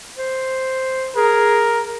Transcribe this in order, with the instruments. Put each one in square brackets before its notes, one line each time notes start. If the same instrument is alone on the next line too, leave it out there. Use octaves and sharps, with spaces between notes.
[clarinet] C5
[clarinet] G#4 [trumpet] A#4